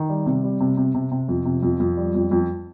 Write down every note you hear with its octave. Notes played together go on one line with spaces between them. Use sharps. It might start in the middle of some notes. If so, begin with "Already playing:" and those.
Already playing: D#3
G3
C3
G3
C3
C3
C3
C3
F2
C3
F2
F2
G3
F2
F2